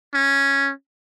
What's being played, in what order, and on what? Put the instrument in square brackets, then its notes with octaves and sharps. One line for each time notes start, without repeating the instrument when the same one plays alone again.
[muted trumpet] C#4